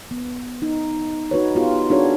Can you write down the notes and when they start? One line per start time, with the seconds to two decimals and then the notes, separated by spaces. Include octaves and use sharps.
0.11 B3
0.62 D#4
1.31 D#4 F#4 B4 C#5
1.55 B3 F4 G4
1.90 D4 E4 F#4 G#4 A#4 C#5